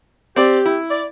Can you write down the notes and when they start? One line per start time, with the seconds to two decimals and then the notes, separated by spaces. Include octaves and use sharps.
0.36 C4 G4 D5
0.66 E4
0.90 D5